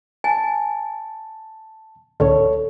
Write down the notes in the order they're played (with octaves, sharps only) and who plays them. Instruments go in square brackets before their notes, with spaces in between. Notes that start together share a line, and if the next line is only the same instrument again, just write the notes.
[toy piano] G#5 [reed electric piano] A5
[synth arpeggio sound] C#2 A2 D3 [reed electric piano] A4 C#5